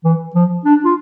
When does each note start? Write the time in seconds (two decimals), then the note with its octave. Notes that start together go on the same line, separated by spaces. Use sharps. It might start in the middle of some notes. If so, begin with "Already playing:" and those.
0.04 E3
0.35 F3
0.65 D4
0.85 F4